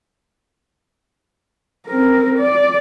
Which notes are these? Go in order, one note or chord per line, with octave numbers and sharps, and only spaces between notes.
C4 A#4
D5